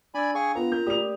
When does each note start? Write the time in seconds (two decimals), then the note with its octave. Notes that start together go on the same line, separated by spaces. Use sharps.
0.14 D4 D5 G#5 B5 E6
0.35 D4 G#4 F5 G5 G#5 C#6
0.55 B3 F4 A#5
0.72 A#3 C#4 A#4 G6
0.87 A3 G4 D5 D#6 F7